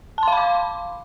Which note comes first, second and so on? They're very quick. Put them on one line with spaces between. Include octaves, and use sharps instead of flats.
A5 C6 F5 B5 D6